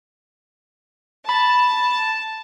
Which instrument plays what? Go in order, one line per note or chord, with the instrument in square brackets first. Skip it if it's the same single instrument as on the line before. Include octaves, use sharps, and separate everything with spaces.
[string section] A5 [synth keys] B5